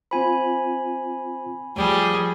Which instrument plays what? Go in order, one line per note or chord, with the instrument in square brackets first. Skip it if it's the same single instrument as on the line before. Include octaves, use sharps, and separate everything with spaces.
[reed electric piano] C4 F4 C5 [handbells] G#5 B5
[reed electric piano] D#2 A3 [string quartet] F3 G3 G#4